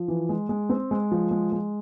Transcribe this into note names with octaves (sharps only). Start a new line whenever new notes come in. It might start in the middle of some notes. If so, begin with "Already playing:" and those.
Already playing: F3
E3
G#3
G#3
C4
G#3
F3
G#3
G#3